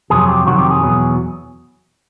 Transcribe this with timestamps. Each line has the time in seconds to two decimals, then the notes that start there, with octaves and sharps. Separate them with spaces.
0.10 F2 C3 D#3 F#3 G#4
0.28 G4
0.46 F2 C3 D#3 F#3 F#4
0.58 G4
0.71 G#4
0.82 E2 B2 F#3